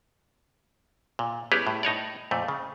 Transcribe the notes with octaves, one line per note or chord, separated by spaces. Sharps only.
A#2
G3 B3 C#4 E4 G4 G#4
A2
A2 D#4 C#5 D5
F2 A#2 A3
C#3